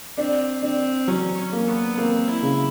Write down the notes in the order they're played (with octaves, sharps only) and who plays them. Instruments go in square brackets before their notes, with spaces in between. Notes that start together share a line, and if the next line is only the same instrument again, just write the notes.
[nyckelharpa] C4 [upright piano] D4
[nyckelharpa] C4 [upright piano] D4
[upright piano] F#3 [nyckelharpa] C#4
[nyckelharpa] C#4
[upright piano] A#3
[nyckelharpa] B3
[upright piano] A#3 [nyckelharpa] C4
[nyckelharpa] E4
[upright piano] C#3